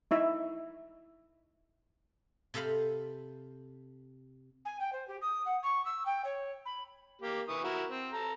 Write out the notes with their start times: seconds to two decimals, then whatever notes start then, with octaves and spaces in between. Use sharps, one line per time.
0.11 D#4 E4 E5
2.54 C3 A4 C5 F5 B5
4.65 G#5
4.80 G5
4.93 C5
5.08 G4
5.22 D#6
5.45 F#5
5.63 C#6
5.85 E6
6.06 G5
6.25 C#5
6.65 B5
7.22 A#3 G4
7.49 E3 C#6 D#6
7.64 E4 F#4 A#4
7.90 C4
8.13 A4 A#5